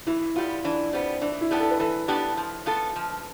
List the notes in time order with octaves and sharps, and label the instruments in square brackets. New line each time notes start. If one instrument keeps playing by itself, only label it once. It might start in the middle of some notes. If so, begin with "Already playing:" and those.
[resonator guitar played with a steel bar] E3 [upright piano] E4
[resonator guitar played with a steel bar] G3 B3 [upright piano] F4
[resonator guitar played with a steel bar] E3 [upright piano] D4
[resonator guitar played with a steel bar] G3 B3 [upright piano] C4
[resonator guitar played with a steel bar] E3 [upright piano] D4
[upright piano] E4
[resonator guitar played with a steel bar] G3 B3 D4 G4
[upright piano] A4
B4
[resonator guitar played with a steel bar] E3 [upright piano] A4
[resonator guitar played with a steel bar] G3 B3 D4 G4
F3
B3 F4 A4
F3